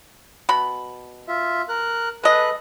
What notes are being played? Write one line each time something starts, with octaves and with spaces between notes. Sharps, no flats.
B2 B5
F4 E5
A#4 F#6
G#3 A4 B4 D#5 F#6